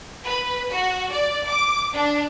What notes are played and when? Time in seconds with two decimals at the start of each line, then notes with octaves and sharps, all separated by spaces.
0.24 B4
0.71 F#4
1.11 D5
1.47 D6
1.93 D4